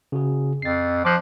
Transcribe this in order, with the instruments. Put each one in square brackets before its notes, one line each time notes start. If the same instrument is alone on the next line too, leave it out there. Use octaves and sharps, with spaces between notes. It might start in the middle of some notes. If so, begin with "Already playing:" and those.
[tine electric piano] C#3 F#4 G#4
[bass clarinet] F2 [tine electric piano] A6 C7
[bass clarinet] F3 [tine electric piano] D6 F#6